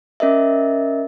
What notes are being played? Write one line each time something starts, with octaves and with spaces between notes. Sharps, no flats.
C#4 A#4 D#5 E5